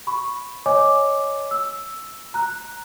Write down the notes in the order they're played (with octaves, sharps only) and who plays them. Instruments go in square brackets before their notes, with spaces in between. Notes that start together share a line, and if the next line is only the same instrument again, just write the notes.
[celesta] B5 C#6
C#5 D#5 G#5 D6
E6
A#5 F#6